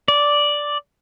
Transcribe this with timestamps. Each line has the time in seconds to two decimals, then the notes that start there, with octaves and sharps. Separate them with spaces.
0.08 D5